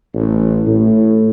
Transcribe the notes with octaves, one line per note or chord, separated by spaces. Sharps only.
A1
A2